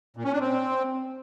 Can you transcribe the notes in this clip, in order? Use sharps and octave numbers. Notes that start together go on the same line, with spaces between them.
A#2
C#4
D4
C4